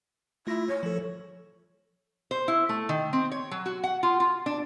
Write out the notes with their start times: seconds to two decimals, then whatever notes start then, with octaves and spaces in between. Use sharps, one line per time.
0.47 A3 E4 F4 A#6
0.68 C#5
0.83 F3 A4
2.31 C5
2.48 E4
2.69 A3
2.89 D#3
3.13 C4
3.31 C#5
3.51 F#3
3.66 F#4
3.84 F#5
4.03 F4
4.20 F4
4.46 D4